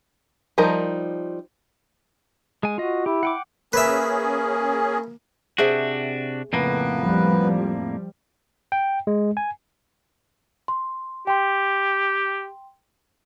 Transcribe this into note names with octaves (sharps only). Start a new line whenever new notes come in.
F3 G3 D#4 A#4
G#3 G#5
F4 F#4 D#5
E4 G4
F#5 G5 D6
A#3 C#4 G#4 B4 E5
C3 D4 F#4 G#4 C5 E5
F2 A2 C#3 A#3 B3 B4
F3 G3
G5
G#3
G#5
C6
G4 G5 C6